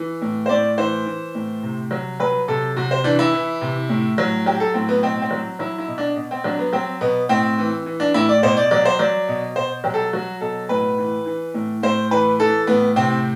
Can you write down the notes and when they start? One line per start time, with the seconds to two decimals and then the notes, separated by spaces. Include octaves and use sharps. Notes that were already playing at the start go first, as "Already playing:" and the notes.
Already playing: E3
0.22 A2
0.46 C5
0.49 A2 D5
0.78 E3 C5
1.06 E3
1.35 A2
1.63 C3
1.91 F#3
2.20 F#3 B4
2.48 C3 A4
2.76 C3 F#4
2.91 C5
3.04 E3 D4
3.19 E4
3.33 E3
3.61 C3
3.89 A2
4.18 F#3
4.46 F#3 G4
4.60 A4
4.74 A2 C4
4.89 B3
5.03 B2 C4
5.22 C4
5.31 F#3
5.59 F#3 E4
5.78 E4
5.88 B2
5.98 D4
6.16 B2
6.31 C4
6.44 F#3 D4
6.59 B3
6.73 F#3 C4
7.01 B2 B3
7.29 A2 C4
7.58 E3
7.86 E3
8.00 D4
8.14 A2 E4
8.29 D5
8.43 B2 C5
8.57 D5
8.71 F#3 D5
8.85 C5
8.99 F#3 D5
9.28 B2
9.56 B2 C5
9.84 F#3 G4
9.94 A4
10.13 F#3 F#4
10.41 B2 A4
10.69 A2 B4
10.98 E3
11.26 E3
11.54 A2
11.83 A2 C5
12.11 E3 B4
12.40 E3 A4
12.67 A2 B3
12.96 C3 C4